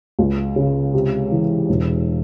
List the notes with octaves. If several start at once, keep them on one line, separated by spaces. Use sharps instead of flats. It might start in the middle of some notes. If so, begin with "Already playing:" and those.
C#2
C#3
C3
E3
E1